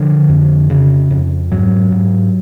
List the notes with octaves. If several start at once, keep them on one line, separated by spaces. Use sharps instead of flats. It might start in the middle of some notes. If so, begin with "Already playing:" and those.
Already playing: D3 F3
F2
C#3
F2
G#2 F#3
G#2